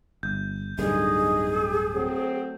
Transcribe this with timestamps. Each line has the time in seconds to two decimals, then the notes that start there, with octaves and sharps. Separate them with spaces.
0.23 G1 G6
0.79 D1 G2 D3 D#4 G#4 D#5
1.95 F#3 A3 C4